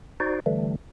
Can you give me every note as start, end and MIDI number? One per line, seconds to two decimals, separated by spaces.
0.20 0.40 63
0.20 0.40 66
0.20 0.40 72
0.20 0.40 74
0.46 0.76 50
0.46 0.76 52
0.46 0.76 55
0.46 0.76 57